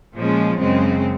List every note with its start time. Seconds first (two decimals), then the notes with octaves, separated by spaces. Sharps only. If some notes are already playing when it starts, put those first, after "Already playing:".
0.14 A#2 F3 G#3 C#4
0.61 F#2 C#3 G#3 C4